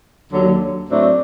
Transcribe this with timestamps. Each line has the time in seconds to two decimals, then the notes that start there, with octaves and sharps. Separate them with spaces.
0.33 D#2 D3 F#3
0.90 A2 F#3 A3 C4 D4